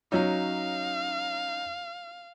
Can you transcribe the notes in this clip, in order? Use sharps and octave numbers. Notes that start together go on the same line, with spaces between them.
F#3 C#4 D#4 F5